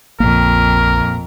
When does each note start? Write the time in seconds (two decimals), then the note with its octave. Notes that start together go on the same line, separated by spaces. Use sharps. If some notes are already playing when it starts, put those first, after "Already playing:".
0.20 A#1 F2 A#2 A#3 A#4